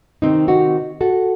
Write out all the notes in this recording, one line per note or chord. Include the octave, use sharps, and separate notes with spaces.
C3 D#3 C4 D#4
D#4 F#4
F#4 A4